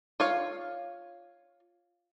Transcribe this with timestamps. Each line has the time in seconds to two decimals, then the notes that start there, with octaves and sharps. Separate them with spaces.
0.20 F4 C#5 F5